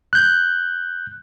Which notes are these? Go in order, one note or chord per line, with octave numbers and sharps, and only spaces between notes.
F#6 G6